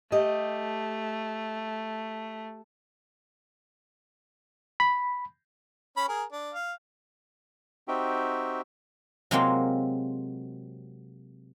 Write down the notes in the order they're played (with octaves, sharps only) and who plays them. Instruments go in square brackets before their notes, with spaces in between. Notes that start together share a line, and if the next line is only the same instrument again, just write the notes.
[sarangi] A3 [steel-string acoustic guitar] G4 D#5
[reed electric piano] B5
[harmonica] C#4 B5
G#4 A#4
D4
F5
[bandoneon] C4 D#4 F#4 G4 E5 G5
[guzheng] C3 F#3 G#3 A#3 C4 F4